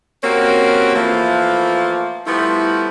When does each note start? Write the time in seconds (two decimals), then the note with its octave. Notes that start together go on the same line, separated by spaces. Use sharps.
0.23 A#3 C4 C#4 F#4 G4 A#4
0.95 E3 F3 A3 A#3
2.27 F3 G3 A3 B3 E4